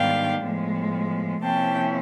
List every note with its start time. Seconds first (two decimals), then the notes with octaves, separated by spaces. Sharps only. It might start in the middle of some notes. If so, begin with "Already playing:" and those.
Already playing: G#2 D#3 G3 B3 D4 F5 G5
0.42 A2 F3 G#3 B3
1.42 C3 F3 A#3 C#4 E4 G5 A5